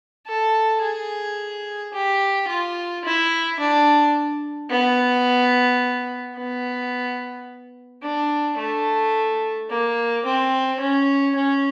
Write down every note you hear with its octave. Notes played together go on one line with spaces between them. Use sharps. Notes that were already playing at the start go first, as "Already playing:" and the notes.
A4
G#4
G4
F4
E4
D4
B3
B3
D4
A3
A#3
C4
C#4
C#4